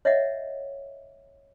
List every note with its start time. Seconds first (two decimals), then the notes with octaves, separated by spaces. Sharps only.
0.05 C#5 D#5 E5 F#5